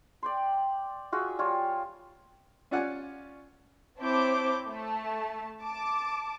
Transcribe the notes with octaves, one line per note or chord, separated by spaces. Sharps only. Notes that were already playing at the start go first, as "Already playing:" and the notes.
D5 G5 C6
F4 F#4 G#4 E5
G3 F4 C#5
C#4 F4 D5 F#5 G#5
C4 E4 C#5 A5 D6 G6
A3 A5
A5 D6